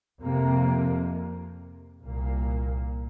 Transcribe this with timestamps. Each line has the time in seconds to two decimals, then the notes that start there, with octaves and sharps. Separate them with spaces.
0.22 F2 C3 A#3
2.03 C2 A#2 A#3